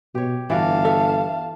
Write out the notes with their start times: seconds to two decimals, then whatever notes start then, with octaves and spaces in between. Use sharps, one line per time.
0.15 B2 G4 C#5
0.50 G1 E3 F#4 D5 F5 A5
0.85 A4 E5